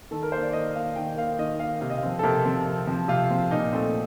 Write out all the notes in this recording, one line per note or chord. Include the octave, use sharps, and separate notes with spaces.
D#3 A4
A#4
A#3 C5
D5
D#3 D#5
A#3 F5
D#3 G5
A#3 F5
D#3 D#5
A#3 F5
C3 F5
D#5
F5
F3 C4
A4
C3 A#4
F3 C4
C3
F3 C4
C3 F4
F3 C4
A#2 D#4
A3 C4